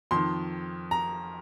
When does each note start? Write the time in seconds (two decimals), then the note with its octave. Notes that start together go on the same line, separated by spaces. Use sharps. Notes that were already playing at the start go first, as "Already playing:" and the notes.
0.11 F2 D#3 C6
0.91 A#5